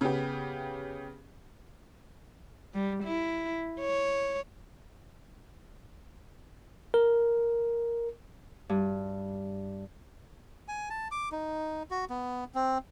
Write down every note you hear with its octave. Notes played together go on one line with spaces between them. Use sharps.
C#3 B3 G4
G3
E4
C#5
A#4
G2
G#5
A5
D6
D#4
F#4
B3
C4